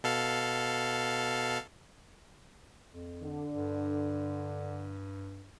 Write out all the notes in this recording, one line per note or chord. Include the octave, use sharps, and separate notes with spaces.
B2 A4 F5
F2
D3
G2